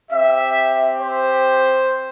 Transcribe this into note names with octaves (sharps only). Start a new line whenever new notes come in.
C4 G4 E5
C5